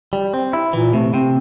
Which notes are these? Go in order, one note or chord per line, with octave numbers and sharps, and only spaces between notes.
G3
C4
E4
A#2 E3
C3 A3
C3 C4